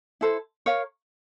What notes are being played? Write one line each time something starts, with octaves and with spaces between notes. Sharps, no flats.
E4 A4 C5
A#4 C#5 F5